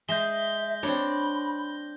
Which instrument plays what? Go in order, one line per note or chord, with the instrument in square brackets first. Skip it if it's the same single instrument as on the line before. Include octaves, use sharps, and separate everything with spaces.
[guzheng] G#3 [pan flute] E5 [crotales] G6 A#6 G7
[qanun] C4 C#5 [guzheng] D4 [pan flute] B5